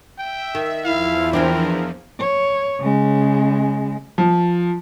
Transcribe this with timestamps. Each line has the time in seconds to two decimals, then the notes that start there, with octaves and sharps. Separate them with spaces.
0.19 E5 G5
0.55 D#3
0.85 E2 F3 E4 F5
1.33 E3 C4 D4 A#4
2.19 C#5
2.80 C#3 G#3
4.18 F3